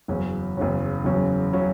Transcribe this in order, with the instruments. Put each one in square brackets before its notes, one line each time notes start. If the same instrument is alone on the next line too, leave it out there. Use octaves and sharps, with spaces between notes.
[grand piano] F#1 E2 C#3 F#3 C#4
F#1 E2 C#3 F#3 C#4
F#1 E2 C#3 F#3 C#4
C#3 F#3 C#4